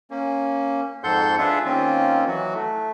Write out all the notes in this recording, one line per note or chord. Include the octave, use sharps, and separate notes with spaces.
A#3 C#4
F2 G#2 A4 F#5 C6 G6
D4 F4 G#4 B4 E5
D#3 A#3 C4 C#4 F4
E3 F#3 F#4
A3